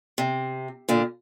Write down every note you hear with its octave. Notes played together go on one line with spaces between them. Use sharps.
C3
A#2 D3